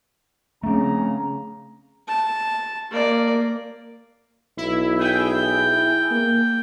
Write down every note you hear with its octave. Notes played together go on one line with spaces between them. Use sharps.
C#3 A3 C4 A#5
A5
A#3 D5
B1 E4
E4 G#4 G5
A#3